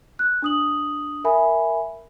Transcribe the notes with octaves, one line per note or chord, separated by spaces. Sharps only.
F#6
D4 D#6 F#7
A#4 E5 G#5 B5